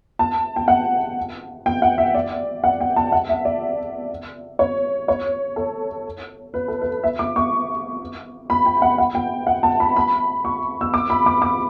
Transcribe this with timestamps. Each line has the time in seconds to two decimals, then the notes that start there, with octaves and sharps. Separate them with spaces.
0.19 A5
0.56 G5
0.68 F#5
1.66 G5
1.82 F#5
1.98 E5
2.14 D5
2.64 F#5
2.80 G5
2.96 A5
3.12 F#5
3.29 E5
3.45 D5
4.59 C#5
5.08 C#5
5.56 A4
6.54 B4
6.68 A4
6.81 B4
7.04 E5
7.19 D6
7.36 C#6
8.50 B5
8.66 G5
8.82 F#5
8.98 F#5
9.15 G5
9.47 F#5
9.63 A5
9.80 B5
9.96 B5
10.45 C#6
10.81 E6
10.94 D6
11.10 B5
11.26 D6
11.42 D6